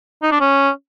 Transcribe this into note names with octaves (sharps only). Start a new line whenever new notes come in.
D#4
D4
C#4